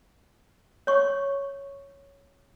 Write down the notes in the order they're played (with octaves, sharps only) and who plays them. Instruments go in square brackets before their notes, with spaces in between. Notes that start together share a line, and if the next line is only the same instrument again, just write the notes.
[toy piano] C#5 C#6